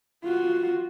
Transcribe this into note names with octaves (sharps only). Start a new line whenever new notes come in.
F4 F#4